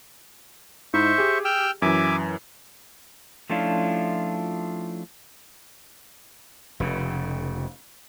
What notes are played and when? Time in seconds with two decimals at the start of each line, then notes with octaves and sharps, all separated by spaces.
0.94 G#2 D#4 E4 C5 E5 C#6
1.18 G4 G#4
1.45 G5 E6 F6
1.82 F#2 E3 E5 G#5 D6
3.50 F3 A3 C#4 D4 E4 F4
6.80 F1 C#3